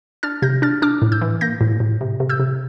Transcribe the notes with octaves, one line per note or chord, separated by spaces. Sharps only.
D4 F6 A6
C3 G6 A#6
D4 F6 A6
D4 D6 F6
A2
E6 G6
E3
A#3 G6 A#6
A2
A2
C3
C3
E6 G6
C3